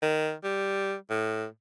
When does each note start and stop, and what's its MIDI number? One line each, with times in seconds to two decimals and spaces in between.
0.03 0.34 51
0.44 0.94 55
1.10 1.46 45